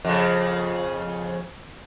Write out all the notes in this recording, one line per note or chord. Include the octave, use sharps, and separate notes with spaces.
F2 C#3